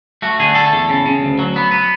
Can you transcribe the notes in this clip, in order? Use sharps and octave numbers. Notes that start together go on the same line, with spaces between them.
A3 F#4
D3 G#4
A3 A4
E2
C#3
C#3
D2
F#3
B3
B3